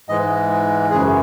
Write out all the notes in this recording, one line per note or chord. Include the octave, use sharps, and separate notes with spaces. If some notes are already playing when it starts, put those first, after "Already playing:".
G#2 E3 G#3 D#5
F#2 C#3 E3 G#4